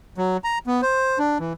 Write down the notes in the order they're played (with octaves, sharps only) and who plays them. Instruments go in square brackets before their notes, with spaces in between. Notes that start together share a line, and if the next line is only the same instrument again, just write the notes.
[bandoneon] F#3
A#5
B3
C5
D4
E3